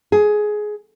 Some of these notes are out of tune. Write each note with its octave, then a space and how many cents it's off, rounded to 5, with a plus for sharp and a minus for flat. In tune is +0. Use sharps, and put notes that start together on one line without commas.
G#4 +15